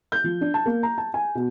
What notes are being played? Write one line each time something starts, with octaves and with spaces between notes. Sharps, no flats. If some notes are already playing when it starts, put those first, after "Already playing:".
G6
F3
D4
A5
A#3
A#5
A5
G#5
B2